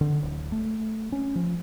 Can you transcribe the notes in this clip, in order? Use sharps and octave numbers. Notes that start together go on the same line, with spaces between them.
D3
D1
A3
C#4
F3